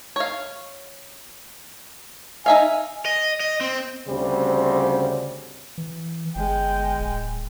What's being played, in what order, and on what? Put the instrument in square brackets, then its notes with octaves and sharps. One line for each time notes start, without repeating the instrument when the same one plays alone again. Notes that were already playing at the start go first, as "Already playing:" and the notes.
[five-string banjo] C#5 F5
[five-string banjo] D#4 E5 F5 [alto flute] G#5
[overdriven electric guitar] D#5
D#5
C4
[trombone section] D2 C#3 G3 C4
[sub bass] E3
[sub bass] G1 [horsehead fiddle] G#3 G5
[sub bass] D1